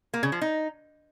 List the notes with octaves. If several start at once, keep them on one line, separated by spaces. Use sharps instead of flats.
A#3
C#3
F3
D#4